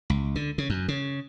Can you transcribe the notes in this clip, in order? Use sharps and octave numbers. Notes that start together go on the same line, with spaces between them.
C#2
D3
C#3
F#2
C#3